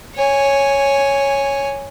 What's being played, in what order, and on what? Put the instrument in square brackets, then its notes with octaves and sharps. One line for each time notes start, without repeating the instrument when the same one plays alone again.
[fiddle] C#5 G#5